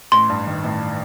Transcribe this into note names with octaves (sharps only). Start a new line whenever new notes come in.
A1 C6
G2
D#3
A1